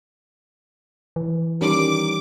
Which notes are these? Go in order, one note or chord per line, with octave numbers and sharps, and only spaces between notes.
E3
D#3 G3 C#4 A#4 D6